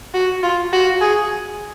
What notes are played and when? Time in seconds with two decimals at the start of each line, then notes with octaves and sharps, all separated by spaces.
0.14 F#4
0.43 F4
0.73 F#4
1.01 G#4